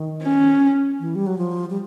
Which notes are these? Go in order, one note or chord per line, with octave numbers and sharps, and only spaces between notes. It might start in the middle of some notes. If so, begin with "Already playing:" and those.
Already playing: D#3
C#4
E3
G3
F#3
F3
G3